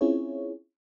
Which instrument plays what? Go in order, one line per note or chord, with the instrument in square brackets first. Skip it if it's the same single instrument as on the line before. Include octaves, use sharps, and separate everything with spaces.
[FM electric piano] C4 C#4 E4 F4 G#4 C#5